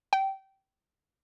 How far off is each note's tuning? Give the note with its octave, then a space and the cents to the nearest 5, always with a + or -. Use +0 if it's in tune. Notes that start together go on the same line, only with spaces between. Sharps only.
G5 -20